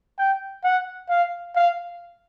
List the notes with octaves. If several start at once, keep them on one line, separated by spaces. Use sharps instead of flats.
G5
F#5
F5
F5